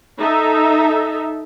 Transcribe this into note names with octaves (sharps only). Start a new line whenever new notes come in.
D#4 A4 E5